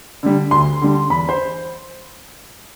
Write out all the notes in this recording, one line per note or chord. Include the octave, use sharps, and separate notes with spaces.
D3 G3
D2 C6
D3 G3
E2 B5
C5